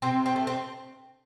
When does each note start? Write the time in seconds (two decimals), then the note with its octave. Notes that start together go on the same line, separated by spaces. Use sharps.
0.02 C3 C4
0.26 C4
0.36 A3
0.47 C4